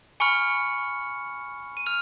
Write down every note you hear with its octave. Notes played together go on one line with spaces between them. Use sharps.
G#5 B5 C#6 F6 C#7
D#7
F6 F7